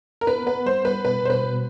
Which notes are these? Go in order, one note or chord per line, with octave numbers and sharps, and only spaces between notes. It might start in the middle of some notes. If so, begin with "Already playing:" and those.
A#4
B3 B4
B3 B4
G3 C5
G3 B4
B2 B4
B2 C5
B4
B2